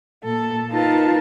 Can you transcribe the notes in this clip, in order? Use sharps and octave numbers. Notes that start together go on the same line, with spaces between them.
A#2 A4
D#4 F4 A#4 B4 A5